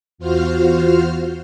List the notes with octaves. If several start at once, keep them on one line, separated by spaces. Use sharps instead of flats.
E2 F4 F#4 C5 F6